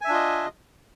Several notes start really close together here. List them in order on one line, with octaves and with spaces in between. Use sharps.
G#5 E5 D4 F4 D#5